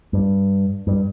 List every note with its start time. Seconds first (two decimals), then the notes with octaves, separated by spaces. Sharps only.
0.13 G2
0.87 G2